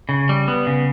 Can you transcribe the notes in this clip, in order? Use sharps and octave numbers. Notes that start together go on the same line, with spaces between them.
C#3
G3
B3
C#3